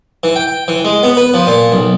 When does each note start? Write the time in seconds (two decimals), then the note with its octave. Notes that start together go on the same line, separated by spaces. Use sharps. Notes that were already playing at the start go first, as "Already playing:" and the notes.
0.24 E3
0.36 G5
0.68 E3
0.85 G#3
1.03 B3
1.17 B4
1.34 F3
1.47 A#2
1.72 B1